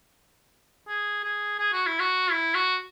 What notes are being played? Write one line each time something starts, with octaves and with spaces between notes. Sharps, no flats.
G#4
G#4
G#4
F#4
E4
F#4
E4
F#4